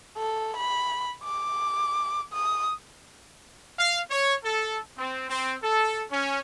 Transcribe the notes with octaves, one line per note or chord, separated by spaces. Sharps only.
A4
B5
D6
D#6
F5
C#5
A4
C4
C4
A4
C#4